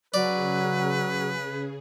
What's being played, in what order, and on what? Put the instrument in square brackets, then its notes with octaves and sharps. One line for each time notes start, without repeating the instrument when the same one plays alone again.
[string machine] C#3 G#4 [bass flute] F#3 [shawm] B4 [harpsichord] D5